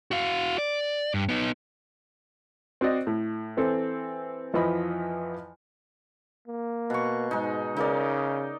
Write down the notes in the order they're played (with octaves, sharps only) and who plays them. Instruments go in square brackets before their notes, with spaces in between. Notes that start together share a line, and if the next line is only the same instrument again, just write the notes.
[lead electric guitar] F#4 F5
D5
G2
B3 D#4
[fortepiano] C4 F#4 D5 D#5
A2
E3 C4 A4 C5
F2 E3 F3 D#5 B5
[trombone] A#3
[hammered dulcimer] B2 C#6
[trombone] G#2 [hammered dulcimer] G#3 D#4
[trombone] C#3 [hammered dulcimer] D#4 A#4 D5